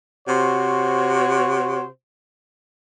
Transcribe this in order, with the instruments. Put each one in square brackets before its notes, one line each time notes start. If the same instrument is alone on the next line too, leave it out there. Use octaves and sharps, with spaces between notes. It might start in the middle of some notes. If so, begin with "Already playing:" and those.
[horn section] C3 F#4 C5 C#5